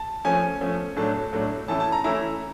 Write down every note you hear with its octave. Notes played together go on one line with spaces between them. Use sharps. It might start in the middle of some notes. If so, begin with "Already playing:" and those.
Already playing: A5
F3 A3 C#4 G#5
F3 A3 C#4
A2 F#3 A3 D4 A5
A2 F#3 A3 D4
E3 A3 C#4 E4 A5
A5
A#5
E3 A3 C#4 E4 A#5